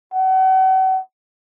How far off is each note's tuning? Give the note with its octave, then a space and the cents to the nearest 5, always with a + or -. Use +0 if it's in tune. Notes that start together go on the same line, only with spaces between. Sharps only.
F#5 +40